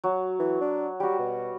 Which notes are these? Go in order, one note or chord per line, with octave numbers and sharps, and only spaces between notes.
F#3
E3
D4
G3 F#4 G4
B2